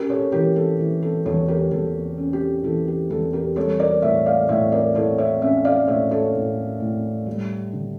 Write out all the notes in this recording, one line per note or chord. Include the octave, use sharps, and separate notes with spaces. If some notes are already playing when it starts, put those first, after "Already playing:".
Already playing: C#4 G4 A#4
A4 C#5
E3 G4 A#4
A4
E3
A4
E2 A4 C#5
G4 A#4
E2 A4
C#4
G4
E3 A4
G4
E2 A4
G4 A#4
G3 A4 C#5
A#4 D5
A2 C#5 E5
D5 F5
A2 C#5 E5
A#4 D5
E4 A4 C#5
C#5 E5
C#4 C#5 E5
D5 F5
A2 C#5 E5
A4 C#5
A2
A2
G3
D3